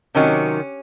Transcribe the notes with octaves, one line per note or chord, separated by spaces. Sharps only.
C3 D#3 F#3 C#4